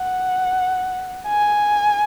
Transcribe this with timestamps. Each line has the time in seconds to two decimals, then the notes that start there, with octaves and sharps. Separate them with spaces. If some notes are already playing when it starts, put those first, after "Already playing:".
Already playing: F#5
1.28 G#5